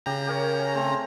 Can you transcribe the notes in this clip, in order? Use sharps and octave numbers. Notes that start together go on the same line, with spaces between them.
C#3 G4 A#5
G4 A#4 C#5
G#5
A3 C4